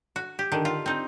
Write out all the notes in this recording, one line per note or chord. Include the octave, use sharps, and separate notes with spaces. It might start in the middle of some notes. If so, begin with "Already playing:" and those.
F#4
G4
D3 D#3
F4
C4 D#4